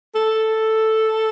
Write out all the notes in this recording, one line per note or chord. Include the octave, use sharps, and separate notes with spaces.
A4